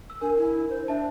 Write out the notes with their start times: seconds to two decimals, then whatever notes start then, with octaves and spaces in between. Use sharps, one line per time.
0.10 E6
0.21 D4 A#4 G#5
0.37 E4
0.70 C5
0.88 D4 E5 A5